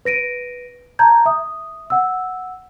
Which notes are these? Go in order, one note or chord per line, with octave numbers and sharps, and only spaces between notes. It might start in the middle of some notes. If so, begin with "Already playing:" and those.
B4 A#6 D7 D#7
A5 A#5 G6 G#6
E5 D#6
F#5 E6